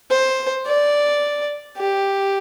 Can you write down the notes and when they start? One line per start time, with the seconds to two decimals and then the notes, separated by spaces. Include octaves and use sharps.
0.11 C5
0.67 D5
1.77 G4